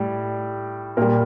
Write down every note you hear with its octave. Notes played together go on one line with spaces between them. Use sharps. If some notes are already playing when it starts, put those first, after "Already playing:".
Already playing: A2 G3
A#2 G3 A#4